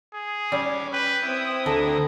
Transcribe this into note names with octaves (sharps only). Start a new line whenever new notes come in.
G#4
G3 C#4 D5
B4 G5
C4 E4 D#6
D2 D3 A4 A#5